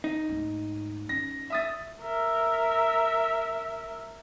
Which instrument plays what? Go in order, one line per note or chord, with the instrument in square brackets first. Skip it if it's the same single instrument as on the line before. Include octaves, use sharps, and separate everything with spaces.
[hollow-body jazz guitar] D#4
[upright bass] D2 G#2
[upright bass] C#4 [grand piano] A#6
[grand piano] E5 D#6 A6
[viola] A#4 E5